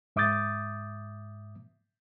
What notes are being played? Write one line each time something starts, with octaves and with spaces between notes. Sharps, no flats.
G#2 E5 D6 D#6 G6 A6